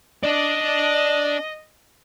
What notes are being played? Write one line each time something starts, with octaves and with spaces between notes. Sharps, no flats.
D4 D5 D#5